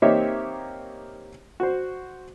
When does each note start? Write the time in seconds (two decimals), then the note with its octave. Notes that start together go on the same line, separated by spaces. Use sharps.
0.02 A#3 C4 D#4 G4 C#5 E5
1.60 F#4 C5